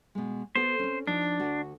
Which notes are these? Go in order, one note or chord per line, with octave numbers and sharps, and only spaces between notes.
B2 G#3
B3 F#4 A4 C5
C4 C#4
F3 D4 D#4
D2 F#4